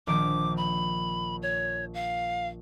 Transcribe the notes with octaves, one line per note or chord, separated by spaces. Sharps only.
A#1 D#3 D6 D7
B5
C#5
F5